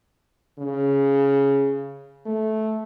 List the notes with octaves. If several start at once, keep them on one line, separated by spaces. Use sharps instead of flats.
C#3
A3